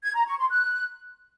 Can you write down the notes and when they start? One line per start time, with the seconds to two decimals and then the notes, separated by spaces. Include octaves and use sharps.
0.03 G#6
0.15 A#5
0.27 C#6
0.38 C6
0.50 F#6